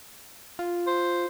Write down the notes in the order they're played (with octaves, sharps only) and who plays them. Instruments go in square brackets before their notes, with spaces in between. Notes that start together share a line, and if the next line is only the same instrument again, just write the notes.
[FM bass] F4
[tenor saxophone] C5